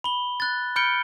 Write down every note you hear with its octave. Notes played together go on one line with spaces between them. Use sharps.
B5 G7
F#6 A6
B5 F6 G6 C#7 D7 G7